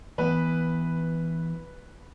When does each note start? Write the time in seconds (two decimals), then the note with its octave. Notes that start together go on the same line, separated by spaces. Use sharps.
0.18 E3 B3 B4